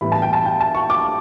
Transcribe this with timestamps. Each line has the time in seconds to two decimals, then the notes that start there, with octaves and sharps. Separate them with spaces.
0.01 A2 E3 G3 B3 B5
0.12 A5
0.22 G5
0.33 A5
0.46 G5
0.61 A5
0.75 C#6
0.90 D6